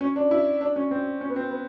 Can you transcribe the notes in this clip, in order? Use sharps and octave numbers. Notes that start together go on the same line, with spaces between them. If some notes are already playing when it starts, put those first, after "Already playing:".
C#4
D4
E4
D4
C#4
C4
C#4
B3
C4
B3